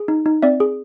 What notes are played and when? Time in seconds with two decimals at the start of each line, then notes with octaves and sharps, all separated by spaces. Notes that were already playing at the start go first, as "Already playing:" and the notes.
Already playing: G#4
0.08 D#4
0.26 D#4
0.42 C4 D5 E5
0.60 G#4